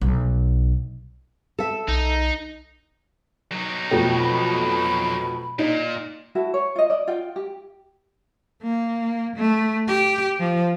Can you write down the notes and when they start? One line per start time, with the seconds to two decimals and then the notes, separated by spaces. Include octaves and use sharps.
0.01 B1
1.59 A4 E5
1.88 B1 D#4
3.52 F#3 D#4
3.91 F2 B2 A3 G5
4.19 B5
5.59 A#2 D#4
6.35 E4 F#4 A4
6.54 C#5
6.76 F4 D#5
6.90 D5 D#5
7.07 F4 F#5 G5
7.36 G4
8.63 A#3
9.37 A3
9.88 G4
10.40 F3